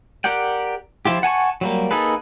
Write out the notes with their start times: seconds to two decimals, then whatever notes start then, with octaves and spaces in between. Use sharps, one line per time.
0.24 G4 A#4 D5 F#5 G5
1.05 F3 E4 F4 G4
1.23 F#5 G#5 A5 C#6
1.61 F#3 G3 A#3
1.91 A#3 D#4 G#4 A4 B4